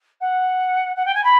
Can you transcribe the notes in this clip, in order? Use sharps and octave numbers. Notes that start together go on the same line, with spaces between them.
F#5
F#5
G5
G#5
B5